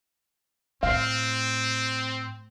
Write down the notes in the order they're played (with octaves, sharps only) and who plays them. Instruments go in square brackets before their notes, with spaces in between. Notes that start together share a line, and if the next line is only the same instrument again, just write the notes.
[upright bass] A2 [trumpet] C4 [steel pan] F5